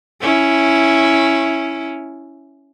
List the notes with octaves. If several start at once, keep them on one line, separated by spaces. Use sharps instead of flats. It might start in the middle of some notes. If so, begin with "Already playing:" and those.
C#4 E4